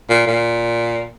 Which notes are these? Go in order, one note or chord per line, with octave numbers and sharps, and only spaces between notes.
A#2
A#2